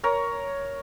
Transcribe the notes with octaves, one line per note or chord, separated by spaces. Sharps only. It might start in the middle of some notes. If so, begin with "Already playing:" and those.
A#4 C#5 A#5